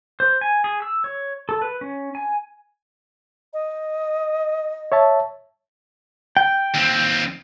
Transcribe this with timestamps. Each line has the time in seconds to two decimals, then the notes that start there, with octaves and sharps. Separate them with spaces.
0.20 C5
0.41 G#5
0.64 G#4
0.82 E6
1.04 C#5
1.49 A4
1.62 B4
1.81 C#4
2.15 G#5
3.53 D#5
4.92 C#5 E5 A5
6.37 G5
6.74 D#2 C4